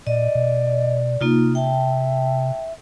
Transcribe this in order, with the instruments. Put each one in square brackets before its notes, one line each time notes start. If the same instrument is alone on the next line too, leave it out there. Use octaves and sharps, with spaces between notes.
[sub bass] A#2 [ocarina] D5 [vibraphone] D#5
[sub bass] B2
[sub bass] C3 [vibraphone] A#3 D#4 F4
[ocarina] E5 [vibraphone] G5 A5